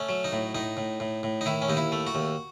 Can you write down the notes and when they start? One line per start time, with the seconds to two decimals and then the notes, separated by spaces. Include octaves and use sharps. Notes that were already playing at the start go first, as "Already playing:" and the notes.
Already playing: A3 C#4
0.09 F#3
0.24 D#4
0.32 A2
0.55 A2 D#4
0.77 A2
1.00 A2
1.23 A2
1.41 D#4
1.46 D#3 E4
1.62 C#4
1.68 D#2 D#4
1.77 E4
1.92 A3
2.07 F#4
2.15 D#2